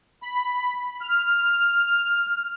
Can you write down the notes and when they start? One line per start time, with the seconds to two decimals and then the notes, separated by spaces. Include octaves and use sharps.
0.23 B5
1.01 F6